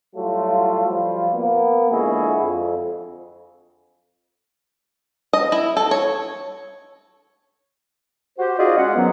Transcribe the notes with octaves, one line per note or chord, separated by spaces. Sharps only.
A2 F#3 G3 A3 F4
F3 G3 F4
A#3 B3
F2 D3 G#3 E4 F#4 G#4
F2
D#5
E4
A4
C#5
F#4 G4 C5
D#4 F4 F#4 G#4 D5 D#5
G#3 C#4 F#5
B2 D#3 F#3 B3